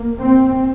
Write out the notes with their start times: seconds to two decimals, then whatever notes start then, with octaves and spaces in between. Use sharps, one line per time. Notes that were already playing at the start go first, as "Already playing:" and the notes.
Already playing: A#3
0.20 C4